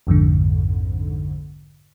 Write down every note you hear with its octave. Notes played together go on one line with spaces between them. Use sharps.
A#1 F2 G#2 D3